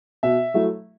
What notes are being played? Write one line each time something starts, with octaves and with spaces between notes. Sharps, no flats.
B2 E5
F#3 A3 E4